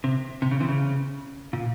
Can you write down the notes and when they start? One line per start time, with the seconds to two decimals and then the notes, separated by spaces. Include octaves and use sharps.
0.04 C3
0.42 C3
0.51 C#3
0.60 C3 E3
0.69 C#3
1.53 A#2